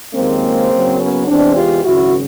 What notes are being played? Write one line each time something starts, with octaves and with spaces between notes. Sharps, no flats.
D#2 C#3 F3 G#3 A#3 C4
F#1 F#2 C#3 F#3
B3 C#4
E2 C3 E3 G#3 C4 D4
F4 G4
G#1 F#2 C#3 E4 F#4